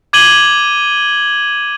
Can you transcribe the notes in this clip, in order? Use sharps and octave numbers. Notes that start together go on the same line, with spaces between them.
D6 G#6 D#7 F#7 G7